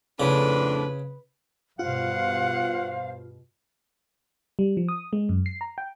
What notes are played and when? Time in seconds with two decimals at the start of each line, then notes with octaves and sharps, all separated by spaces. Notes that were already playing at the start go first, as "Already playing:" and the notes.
0.20 F2 A2 C#3 D4 B4
1.79 G2 B2 F4 C5 F5 F#5
4.59 G3
4.77 F3
4.88 D#6
5.13 G#3
5.29 F#2
5.46 C7
5.61 A#5
5.78 G5